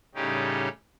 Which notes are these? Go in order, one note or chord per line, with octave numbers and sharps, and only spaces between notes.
A2 C#3 G3 C#4 D#4 G4